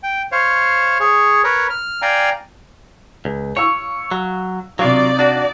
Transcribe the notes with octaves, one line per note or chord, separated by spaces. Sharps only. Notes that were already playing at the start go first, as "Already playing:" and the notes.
G5
C5 C#5 F5
G#4 C#5
A#4 B4 C#5
F6
D5 F5 G5 G#5 A#5
C#2
C#5 F5 C#6 E6
F#3
C3 F#3 D4 D#4 F4 D5 F5
D4 F#4